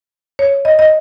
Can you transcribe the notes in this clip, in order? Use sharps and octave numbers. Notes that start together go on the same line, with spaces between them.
C#5
D#5
D#5